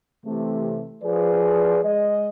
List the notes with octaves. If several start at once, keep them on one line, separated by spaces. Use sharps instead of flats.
C3 E3 A3
F3 G#4 B4 D5
G#3 D#5